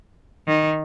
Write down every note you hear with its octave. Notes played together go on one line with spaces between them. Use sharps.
D#3